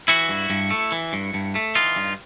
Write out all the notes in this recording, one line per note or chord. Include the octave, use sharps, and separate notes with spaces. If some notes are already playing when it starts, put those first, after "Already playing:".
E3 E4 F#4
G2
G2
A3
E3
G2
G2
A3
E3 D#4 F4
G2